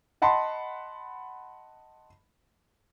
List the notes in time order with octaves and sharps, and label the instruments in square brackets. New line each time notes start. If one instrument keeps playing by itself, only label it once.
[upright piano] D#5 F#5 A5 B5 C6